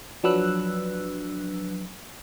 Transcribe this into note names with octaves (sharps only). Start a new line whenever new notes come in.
F3 F#3 D4 B4 E6 F#6